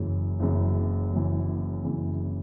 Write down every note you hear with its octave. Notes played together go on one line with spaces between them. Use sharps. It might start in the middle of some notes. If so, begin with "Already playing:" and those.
Already playing: F#1 F#2 C#3 E3
F#1 F#2 C#3 E3
F#1 F#2 C#3 E3
F#1 F#2 C#3 E3